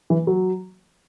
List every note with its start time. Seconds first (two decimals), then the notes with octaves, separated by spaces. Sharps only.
0.10 E3
0.27 F#3